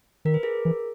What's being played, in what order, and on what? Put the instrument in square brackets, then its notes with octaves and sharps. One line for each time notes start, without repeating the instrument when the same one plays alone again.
[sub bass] D#3 [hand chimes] A#4
[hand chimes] B4
G#4 A#4
[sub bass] E3